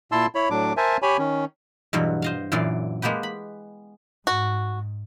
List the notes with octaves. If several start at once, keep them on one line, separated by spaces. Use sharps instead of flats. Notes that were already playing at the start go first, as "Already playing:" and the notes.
A#2 E4 A5 C6 E6
E4 C#5 B5
A2 F#3 D4 D6
A#4 C5 E5 G#5 A5
G4 C#5 G#5 B5
D#3 C#4
E2 G2 B2 F#3
C5 D#5 F5
F#2 A#2 E3 F#3 D5 C6
G#3 A#3 B3 G4 B4
B5
G#2 F#4